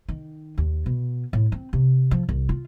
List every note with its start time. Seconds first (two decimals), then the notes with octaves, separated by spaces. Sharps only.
0.09 D#3
0.58 D#2
0.86 B2
1.33 A2
1.52 C4
1.73 C3
2.11 F3
2.29 C2
2.49 F4